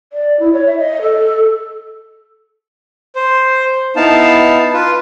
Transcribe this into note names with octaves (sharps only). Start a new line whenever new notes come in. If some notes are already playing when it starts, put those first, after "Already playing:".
D5
E4
C#5
E5
D#5
A4
C5
B3 D#4 E4 F5 A5
F4 B4